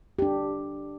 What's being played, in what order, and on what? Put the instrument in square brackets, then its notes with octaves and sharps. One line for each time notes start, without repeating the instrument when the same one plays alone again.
[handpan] D4 G4